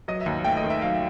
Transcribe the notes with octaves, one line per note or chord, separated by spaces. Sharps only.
F#3 D#5
E5
D#2
A3 G5
D#5
D#3
E5
F#3 F5
E5